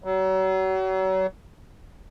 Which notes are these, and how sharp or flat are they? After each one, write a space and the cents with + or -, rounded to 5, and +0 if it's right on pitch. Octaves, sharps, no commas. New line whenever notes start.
F#3 +35